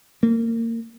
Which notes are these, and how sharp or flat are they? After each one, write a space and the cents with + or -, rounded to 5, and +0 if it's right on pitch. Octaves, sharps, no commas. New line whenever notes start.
A#3 -25